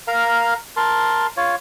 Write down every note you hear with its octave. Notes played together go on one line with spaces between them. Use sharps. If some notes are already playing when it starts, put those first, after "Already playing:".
A#4 F5 A#5
A#4 A5 C6
F4 C#5